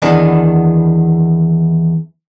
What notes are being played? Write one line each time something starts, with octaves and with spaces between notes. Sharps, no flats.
E2 D#3 B3 D4